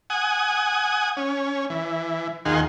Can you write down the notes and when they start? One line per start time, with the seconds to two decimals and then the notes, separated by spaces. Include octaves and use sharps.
0.10 F#5 G#5 D#6
1.17 C#4
1.70 E3
2.45 D#2 D#3 F4 G#4 F#5 C6